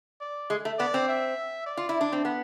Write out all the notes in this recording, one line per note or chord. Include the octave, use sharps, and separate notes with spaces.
D5
G#3
A3
B3 D5
C4
E5
D5
F4
E4
D4
C4
B3